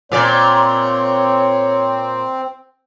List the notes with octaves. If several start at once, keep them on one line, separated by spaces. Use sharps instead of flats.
A#2 C4 C#5 D5